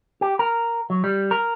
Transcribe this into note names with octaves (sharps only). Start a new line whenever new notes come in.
G4
A#4
F#3
G3
A#4